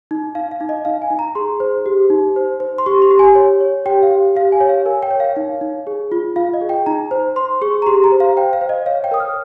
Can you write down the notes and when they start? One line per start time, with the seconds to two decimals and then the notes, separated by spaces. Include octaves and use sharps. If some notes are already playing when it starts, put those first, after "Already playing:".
0.11 D#4
0.35 D#4 F5
0.51 F5
0.61 D#4
0.69 D#5
0.85 D#4 F5
1.02 G#5
1.10 D#4
1.19 A#5
1.35 G#4 C6
1.60 C5
1.86 G4
2.10 D#4
2.36 C5
2.60 C5
2.78 C6
2.86 G4 C#6
3.02 C6
3.10 G4
3.19 G#5
3.35 C#5
3.60 C#5
3.86 G4 G5
4.03 F5
4.11 G4
4.36 G4 F5
4.52 G#5
4.60 C#5
4.69 F5
4.86 A#4 G#5
5.02 G5
5.11 C#5
5.20 F5
5.36 D#4 F5
5.61 D#4
5.87 G#4
6.12 F4
6.36 F4 F5
6.54 D#5
6.61 G#4
6.69 G5
6.86 D#4 A#5
7.11 C5
7.36 C5 C6
7.62 G#4 C#6
7.82 A#5
7.86 G4 C6
8.04 A#5
8.12 C5
8.20 F5
8.37 C5 G5
8.53 F5
8.61 C5
8.69 D#5
8.86 C#5 F5
9.04 G5
9.11 A#4 D#6
9.20 F6